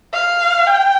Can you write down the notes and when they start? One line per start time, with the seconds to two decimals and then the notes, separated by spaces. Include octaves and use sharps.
0.13 F5
0.67 G5